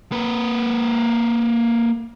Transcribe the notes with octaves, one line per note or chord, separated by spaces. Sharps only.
A#3 B4